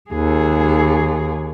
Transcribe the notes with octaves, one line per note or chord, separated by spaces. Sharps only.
D#2 G#4